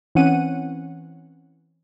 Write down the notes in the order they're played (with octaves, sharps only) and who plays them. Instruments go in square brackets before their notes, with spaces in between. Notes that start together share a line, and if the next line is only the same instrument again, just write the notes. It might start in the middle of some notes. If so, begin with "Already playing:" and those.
[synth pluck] E3 C4 C#4 F#5 D#7